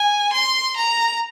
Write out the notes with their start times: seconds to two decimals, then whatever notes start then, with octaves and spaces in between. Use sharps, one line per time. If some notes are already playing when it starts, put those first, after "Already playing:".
Already playing: G#5
0.33 C6
0.76 A#5